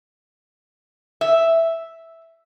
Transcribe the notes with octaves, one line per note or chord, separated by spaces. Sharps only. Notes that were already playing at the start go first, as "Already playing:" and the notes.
E5